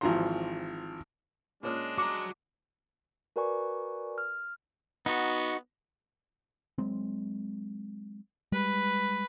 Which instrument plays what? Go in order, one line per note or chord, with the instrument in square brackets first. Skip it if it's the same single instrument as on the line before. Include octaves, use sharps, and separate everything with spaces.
[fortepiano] G#1 E3 F3 F#4 A#5 C6
[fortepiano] A#2 C#4 F6 [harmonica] G#3 D4
[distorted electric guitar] F#4 A#5 [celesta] D6
[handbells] F#4 A#4 B4 D5 G#5 C#6
F6
[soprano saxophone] B3 [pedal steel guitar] D#4 F#4
[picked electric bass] F#3 G#3 C4
[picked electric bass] G3 G#3 [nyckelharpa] B4